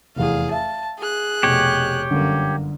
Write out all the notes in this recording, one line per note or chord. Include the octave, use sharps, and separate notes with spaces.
F1 E2 G#4 F5
E5 F5 A5
G#4 F#6
F1 B2 G4 C#5
G1 F#2 D3 A#3